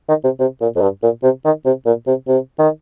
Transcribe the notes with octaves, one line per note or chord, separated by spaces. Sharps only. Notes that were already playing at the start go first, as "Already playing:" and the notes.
D#3
C3
C3
A#2
F2
G2
A#2
C3
D#3
C3
A#2
C3
C3
D#3